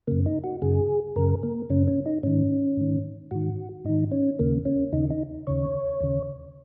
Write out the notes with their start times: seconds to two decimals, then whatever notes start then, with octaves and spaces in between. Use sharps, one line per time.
0.07 F#2 C#3 A#3
0.26 D#4
0.44 F#4
0.62 F#2 C#3 G#4
1.16 F#2 C#3 A#4
1.43 A#3
1.70 F#2 C#3 C#4
1.87 C#4
2.06 D#4
2.23 G#2 D#3 C#4
2.77 G#2 D#3
3.31 G#2 D#3 F#4
3.85 G#2 D#3 D#4
4.12 C#4
4.39 D#2 C#3 A#3
4.65 C#4
4.92 D#2 C#3 D#4
5.10 D#4
5.47 D#2 C#3 C#5
6.01 D#2 C#3